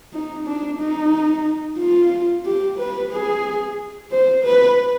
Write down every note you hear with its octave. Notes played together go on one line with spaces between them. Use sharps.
D#4
D4
D#4
F4
G4
B4
G#4
C5
B4